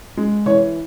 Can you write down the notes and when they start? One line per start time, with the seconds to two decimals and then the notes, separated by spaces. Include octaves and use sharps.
0.17 G#3
0.46 E3 C#5